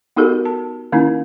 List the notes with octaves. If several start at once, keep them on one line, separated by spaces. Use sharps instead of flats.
B3 D#4 F#4 G4 A4 A#4
A5
D#3 A#3 C#4 D#4 E4